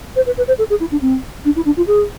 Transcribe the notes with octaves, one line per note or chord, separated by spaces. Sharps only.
C5
B4
B4
C5
A4
G#4
E4
D4
C4
D4
E4
D4
F4
G#4